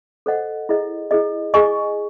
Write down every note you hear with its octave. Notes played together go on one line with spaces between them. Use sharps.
A4 C5 D#5 F#5
E4 G#4 D#5
E4 G#4 D#5
G#4 D#5 G#5 C#6